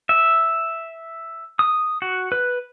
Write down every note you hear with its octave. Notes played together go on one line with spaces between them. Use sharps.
E5
D#6
F#4
B4